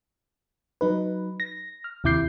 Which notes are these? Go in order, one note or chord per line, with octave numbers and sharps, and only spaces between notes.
F#3 D#4 B4
A#6
F6
D#2 C3 E4 D6 G6 C7